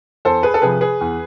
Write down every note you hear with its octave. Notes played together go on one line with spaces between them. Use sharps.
E2 A4 C5
G#4 B4
A4
C3 F3 G#4 B4
G#4 B4
E2